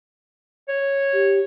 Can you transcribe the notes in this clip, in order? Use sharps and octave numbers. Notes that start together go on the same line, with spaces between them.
C#5
G4